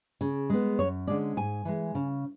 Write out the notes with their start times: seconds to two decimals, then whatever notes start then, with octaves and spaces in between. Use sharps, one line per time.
0.21 C#3
0.50 G#3 B3
0.79 F#2 C#5
1.07 D3 G#3 C#4 D5
1.37 G#2 G#5
1.65 E3 G#3
1.95 C#3